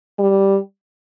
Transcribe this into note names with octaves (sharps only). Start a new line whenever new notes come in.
G3